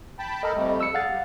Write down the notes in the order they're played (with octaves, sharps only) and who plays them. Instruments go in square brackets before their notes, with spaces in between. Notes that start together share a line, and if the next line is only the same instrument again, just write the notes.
[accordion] G5 A5 B5
[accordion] A4 A#4 [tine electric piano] D#5 B5
[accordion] F2 G3 A3
[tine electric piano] E6 C#7
[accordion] G#4 [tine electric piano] F5 F#5 A6
[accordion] G3